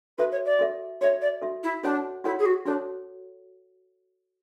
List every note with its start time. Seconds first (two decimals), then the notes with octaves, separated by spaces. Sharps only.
0.18 F#4 A4 B4 E5
0.31 C#5
0.45 D5
0.59 F#4 A4 E5
1.01 F#4 A4 C#5 E5
1.21 D5
1.42 F#4 A4 E5
1.63 E4
1.83 D4 F#4 A4 C#5 F#5
2.24 E4 F#4 A4 C#5 F#5
2.38 G#4
2.45 F#4
2.65 D4 F#4 A4 C#5